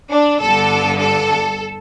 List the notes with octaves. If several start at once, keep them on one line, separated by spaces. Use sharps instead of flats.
D4
G1 G2 D3 A4
A4